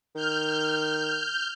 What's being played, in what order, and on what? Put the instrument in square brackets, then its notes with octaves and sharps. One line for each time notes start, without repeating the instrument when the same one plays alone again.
[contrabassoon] D#3 [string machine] F6 G6